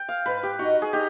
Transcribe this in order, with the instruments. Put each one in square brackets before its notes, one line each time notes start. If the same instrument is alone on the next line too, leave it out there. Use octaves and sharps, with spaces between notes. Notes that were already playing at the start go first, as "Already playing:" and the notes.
Already playing: [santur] G5
F5
[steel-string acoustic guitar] G#2 [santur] B4
[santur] G4
[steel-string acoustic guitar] D#4 [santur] F#4
[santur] G#4
[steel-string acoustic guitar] D#4 [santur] G4